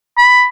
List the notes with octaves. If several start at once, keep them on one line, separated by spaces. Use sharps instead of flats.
B5